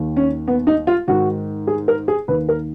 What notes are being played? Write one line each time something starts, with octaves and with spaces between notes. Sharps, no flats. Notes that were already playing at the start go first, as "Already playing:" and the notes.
Already playing: D#2 D#3
C#4
B3
D#4
F4
G#2 D#3 F#4
G#4
A#4
G#4
D#2 D#3 B4
A#4